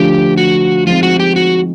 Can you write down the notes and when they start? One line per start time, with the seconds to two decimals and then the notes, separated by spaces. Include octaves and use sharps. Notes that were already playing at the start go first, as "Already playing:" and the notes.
Already playing: D3 F3 A3 D4 F4 G4
0.37 F#4
0.87 F3 G#3 C4 D#4 F4
1.03 F#4
1.20 G4
1.36 F#4